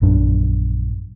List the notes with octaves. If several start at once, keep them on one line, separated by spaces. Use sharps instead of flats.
A#1 F#2 D4